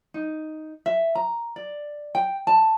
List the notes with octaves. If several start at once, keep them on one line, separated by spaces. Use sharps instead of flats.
D#4
E5
A#5
D5
G5
A5